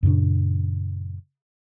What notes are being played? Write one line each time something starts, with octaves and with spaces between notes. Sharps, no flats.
F#2 A#2 C#3 D4